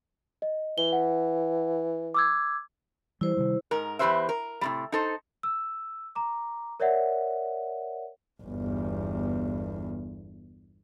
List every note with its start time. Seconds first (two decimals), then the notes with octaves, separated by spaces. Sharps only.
0.42 D#5
0.78 E3 G7
0.93 F#5
2.15 D6 E6 G#6
3.21 E3 G3 E4 C5
3.37 C3 D#3 G3
3.71 G#2 A#4
3.99 E2 F#3 G4 B4 C5 E5
4.29 A#4
4.61 A2 C3 G3
4.92 D#4 A4 C5
5.43 E6
6.15 A#5 D6
6.80 A#4 C#5 D5 E5 F#5
8.43 G1 E2